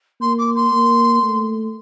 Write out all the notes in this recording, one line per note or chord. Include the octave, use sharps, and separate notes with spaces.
A#3 C6
D6
C6
A#3
A3